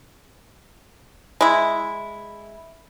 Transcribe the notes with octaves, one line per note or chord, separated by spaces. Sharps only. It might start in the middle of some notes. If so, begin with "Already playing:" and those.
G#3 E4